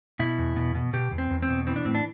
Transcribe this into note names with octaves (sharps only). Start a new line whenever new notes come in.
B2 E4
E2
B2
B2
B2 G4
E2
C4
E2
C4
B2
E3 C4
D4
A2 C4
D4